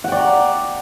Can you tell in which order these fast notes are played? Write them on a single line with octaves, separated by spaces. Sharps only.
F#5 G5 D5 A#5